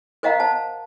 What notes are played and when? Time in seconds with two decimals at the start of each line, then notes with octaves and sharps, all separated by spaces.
0.23 A#4 C5 D#5 F5 F#5 A#5
0.40 C5 A5